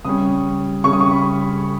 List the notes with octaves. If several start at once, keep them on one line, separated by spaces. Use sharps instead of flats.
C#3 G3 C#4 D#6
C#3 G3 C#4 C#6
D#6
C#6
B5